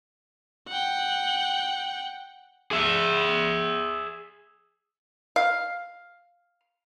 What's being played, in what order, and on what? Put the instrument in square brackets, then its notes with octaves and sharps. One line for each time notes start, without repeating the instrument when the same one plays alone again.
[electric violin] F#5 G5
[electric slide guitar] G#4 E5
[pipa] F5